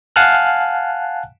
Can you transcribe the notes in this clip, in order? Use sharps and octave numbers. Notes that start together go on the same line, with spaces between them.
F5 F#5 G#5 A5 F6 F#6